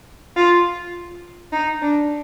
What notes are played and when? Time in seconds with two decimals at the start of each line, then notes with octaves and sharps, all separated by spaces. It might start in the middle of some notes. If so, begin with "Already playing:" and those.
0.36 F4
1.52 D#4
1.81 D4